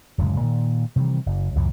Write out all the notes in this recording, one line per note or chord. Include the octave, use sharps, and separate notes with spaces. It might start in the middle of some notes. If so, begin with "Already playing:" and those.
D1 F#2 C#3 G#3
A#2 D#3
C3 D#3 E3 G3
F#1
C#2 F#2 A2 E3